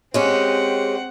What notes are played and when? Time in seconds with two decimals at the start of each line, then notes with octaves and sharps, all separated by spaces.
0.14 G#3 C4 C#4 G4 F#5